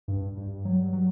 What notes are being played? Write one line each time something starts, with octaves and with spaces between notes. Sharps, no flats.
G2
G2
F#3
F#3